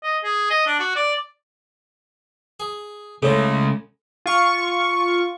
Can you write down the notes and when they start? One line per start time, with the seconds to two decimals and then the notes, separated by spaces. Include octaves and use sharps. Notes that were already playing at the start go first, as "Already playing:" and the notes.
0.03 D#5
0.24 G#4
0.50 D#5
0.67 D4
0.79 F#4
0.96 D5
2.60 G#4
3.23 C#3 G#3 A3 E4 A4 C#5
4.26 F4 C#6